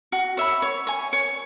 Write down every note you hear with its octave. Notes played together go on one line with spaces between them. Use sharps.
F#4
C#5 E5 B5
C#5
G#5 C#6
C#5